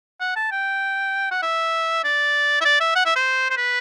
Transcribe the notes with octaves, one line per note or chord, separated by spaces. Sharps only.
F#5
A5
G5
F#5
E5
D5
E5
D5
E5
F#5
E5
C5
C5
B4